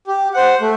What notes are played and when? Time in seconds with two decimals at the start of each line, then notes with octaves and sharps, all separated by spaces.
0.07 G4
0.34 C5 F#5
0.61 A3